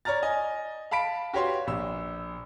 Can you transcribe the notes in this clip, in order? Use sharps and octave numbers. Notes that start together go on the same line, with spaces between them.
C#5 D5 A#5 F6 A6
D#5 G#5
F5 A5 B5 B6 D7
F#4 G4 B4 C#5 F5 C6
A#1 E6